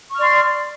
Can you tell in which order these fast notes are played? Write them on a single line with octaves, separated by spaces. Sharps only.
C#6 F6 D5 C6